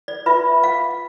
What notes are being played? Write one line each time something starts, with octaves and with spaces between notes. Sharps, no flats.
D5
F4 B4 E5
F5